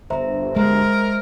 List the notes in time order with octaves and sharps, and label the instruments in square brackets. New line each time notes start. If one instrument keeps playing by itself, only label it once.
[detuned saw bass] G1 [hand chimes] C5 E5 A#5
[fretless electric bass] G#3 [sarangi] A#4